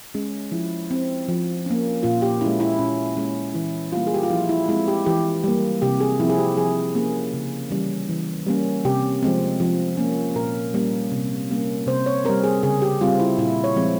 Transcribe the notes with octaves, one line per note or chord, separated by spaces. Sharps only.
G#3 C#4
F3 E4
C4
F3
A#3 C#4
A#2 F4
G4
C#4 E4
G#3
E4
A#2 C#4
G#3 C#4
E3 E4
G3 A#3 F4
G#4
G4
F4
F3 E4
E4
G#3 C4 E4
G4
E3 G4
G3 A#3
C3 G4
G#4
F3 C4 E4
G#4
G4
F3 G#4
A#3 C#4 G#4
C#3
E3 G3 C#4
E3
G3 A#3 C#4
C3 G4
F3 G#3 C4
F3
A#3 C#4
A#2 A#4
G3 A#3 C#4
C3
G3 A#3 C#4
C3 C5
C#5
G3 C4 A#4
G#4
C#3 G#4
G4
G3 C4 F4
E4
A#2 E4
C#5
F3 G#3 C4